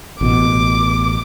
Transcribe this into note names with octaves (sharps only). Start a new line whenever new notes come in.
A1 B2 D6